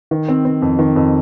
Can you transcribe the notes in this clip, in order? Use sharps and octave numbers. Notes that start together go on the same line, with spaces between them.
D#3
C4
C4
F2
D#3
F2